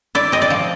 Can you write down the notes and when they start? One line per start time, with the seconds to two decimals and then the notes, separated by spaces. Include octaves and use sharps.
0.15 E4 D5
0.32 C4 D#5
0.42 D5
0.50 F3